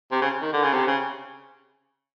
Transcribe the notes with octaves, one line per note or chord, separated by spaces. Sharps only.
C3
C#3
D#3
D3
C#3
C3
C#3